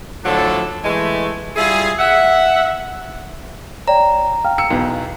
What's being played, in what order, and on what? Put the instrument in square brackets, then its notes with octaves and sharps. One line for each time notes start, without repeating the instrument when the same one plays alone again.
[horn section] A2 D3 F3 F#3 D4 A4
E3 G#3 A3
G3 E4 F4 G#4
E5 F#5
[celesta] C#5 D5 G5 [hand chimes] A#5
[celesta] F5 G5 F6
[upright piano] E6 C#7
B1 E2